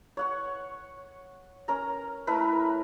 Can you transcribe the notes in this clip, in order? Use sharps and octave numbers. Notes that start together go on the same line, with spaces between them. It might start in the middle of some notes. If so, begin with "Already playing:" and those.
C#5 F#5 C#6
C#4 A#4 A#5
A3 E4 A#4 B4